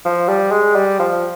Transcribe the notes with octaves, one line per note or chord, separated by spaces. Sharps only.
F3
G3
G#3
G3
F3